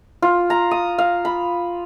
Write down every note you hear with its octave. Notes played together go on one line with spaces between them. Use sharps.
F4
A#5
D#6
F5
B5